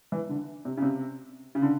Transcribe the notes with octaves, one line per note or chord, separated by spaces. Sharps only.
E3
D3
C3
C#3
C3
C#3
D3